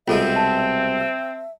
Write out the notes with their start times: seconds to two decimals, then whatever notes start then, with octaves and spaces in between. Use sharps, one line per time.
0.08 C2 B2 G#3 C4 F4 A4 E5 F5
0.36 A5